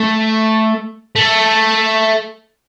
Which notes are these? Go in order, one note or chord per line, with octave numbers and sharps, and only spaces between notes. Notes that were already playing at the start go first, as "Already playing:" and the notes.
Already playing: A3
A3